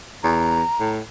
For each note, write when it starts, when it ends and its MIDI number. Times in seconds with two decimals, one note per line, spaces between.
0.23 0.62 40
0.23 0.90 82
0.80 1.00 45